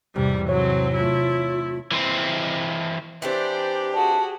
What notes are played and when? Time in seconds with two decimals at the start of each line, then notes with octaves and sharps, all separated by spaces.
0.16 E2 G#2 C3 G3
0.49 F#3 C4 C#5 G#5
0.95 F#3 A3 E4 F4
1.91 E3 C4
3.22 E3 C4 D4 G4 C5 D5
3.94 F#4 G#4 A5